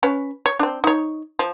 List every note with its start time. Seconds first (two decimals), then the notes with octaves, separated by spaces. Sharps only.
0.03 C#4 B4 C#5
0.46 C#5
0.59 C4 D4
0.84 D#4 C#5
1.39 F3